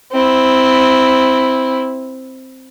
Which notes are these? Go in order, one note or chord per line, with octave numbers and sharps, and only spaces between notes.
C4 E4